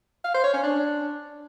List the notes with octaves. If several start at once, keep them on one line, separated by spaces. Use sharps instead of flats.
F5
C5
C#5
C#4
D4